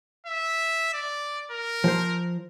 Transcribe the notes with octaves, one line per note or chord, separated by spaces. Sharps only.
E5
D5
A#4
F3 C5